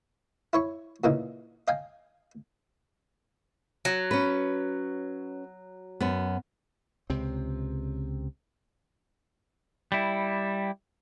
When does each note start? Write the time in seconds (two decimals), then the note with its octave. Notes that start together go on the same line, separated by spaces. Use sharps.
0.53 E4 C#5 C#6
1.04 A#2 C#3 E3 D#4
1.68 D#5 F5 G5 G#5
3.85 F#3
4.11 C#4 B4
6.00 F#2 B3
7.10 C#2 C3 C4
9.92 G3 E4